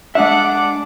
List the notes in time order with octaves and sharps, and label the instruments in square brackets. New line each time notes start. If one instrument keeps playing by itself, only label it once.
[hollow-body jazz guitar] G#3 E5 [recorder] D4 [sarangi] F#5 [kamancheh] D6